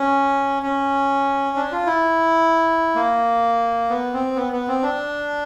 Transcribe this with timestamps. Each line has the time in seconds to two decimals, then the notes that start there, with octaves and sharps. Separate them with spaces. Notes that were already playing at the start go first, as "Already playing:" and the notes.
Already playing: C#4
0.63 C#4
1.56 D4
1.72 F4
1.86 E4
2.95 A#3
3.90 B3
4.13 C4
4.36 B3
4.53 B3
4.68 C4
4.83 D4